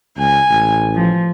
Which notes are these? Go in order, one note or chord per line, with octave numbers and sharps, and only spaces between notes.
C#2 G#5
A1
F3